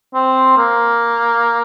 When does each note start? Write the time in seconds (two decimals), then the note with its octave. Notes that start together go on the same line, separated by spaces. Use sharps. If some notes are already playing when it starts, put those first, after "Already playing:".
0.14 C4
0.57 A#3